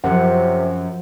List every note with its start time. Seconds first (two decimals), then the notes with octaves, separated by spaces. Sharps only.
0.04 F#2 C3 F3 C5 F#5